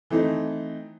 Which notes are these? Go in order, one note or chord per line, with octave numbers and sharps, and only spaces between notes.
E3 A3 C4 D#4